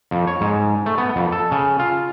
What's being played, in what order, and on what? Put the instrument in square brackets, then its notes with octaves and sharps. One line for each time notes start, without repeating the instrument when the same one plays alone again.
[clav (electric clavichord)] F2
C#5
G#2
A3
B3
F2
A4
C#3
F4